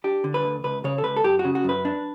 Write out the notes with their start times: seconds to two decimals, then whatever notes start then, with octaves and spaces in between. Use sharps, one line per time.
0.04 D4 G4
0.24 D3
0.34 B4
0.45 D2
0.64 C#2 B4
0.84 C#3 C#5
0.98 A4
1.04 C#2 B4
1.16 A4
1.24 F#2 G4
1.39 F#4
1.45 C#3
1.55 F#4
1.64 F#2 B4
1.85 D4